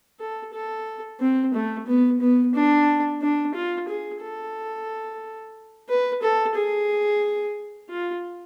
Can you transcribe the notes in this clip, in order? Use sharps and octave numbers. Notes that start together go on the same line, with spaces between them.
A4
A4
C4
A3
B3
B3
D4
D4
F4
G#4
A4
B4
A4
G#4
F4